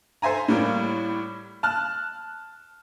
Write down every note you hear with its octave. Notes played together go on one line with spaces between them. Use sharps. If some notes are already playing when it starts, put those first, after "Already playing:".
A4 C5 E5 G#5 A#5
A2 G3 A#3
A5 F6 F#6